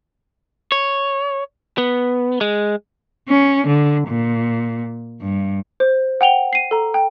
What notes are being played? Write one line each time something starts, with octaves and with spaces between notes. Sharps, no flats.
C#5
B3
G#3
C#4
D3
A#2
G2
C5
F#5 G5 F7 G7
C7 D#7
A4 A#5
G5